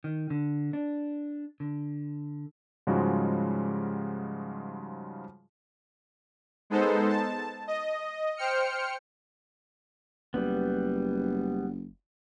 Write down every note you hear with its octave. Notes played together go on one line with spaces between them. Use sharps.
D#3
D3
D4
D3
G#2 C#3 F3 G3 G#3 F#4
G#3 B3 D#4 A4 C5
A5
D#5
C5 G5 F6 C#7
F#1 G3 B3